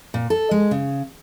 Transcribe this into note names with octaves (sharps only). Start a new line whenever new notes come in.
A#2
A4
G#3
C#3